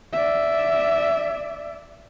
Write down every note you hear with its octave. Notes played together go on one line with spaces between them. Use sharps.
D5 E5